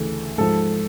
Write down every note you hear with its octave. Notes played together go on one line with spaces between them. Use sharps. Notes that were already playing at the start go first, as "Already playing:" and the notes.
Already playing: D2 C#3 E3 A4
G#2 F3 A4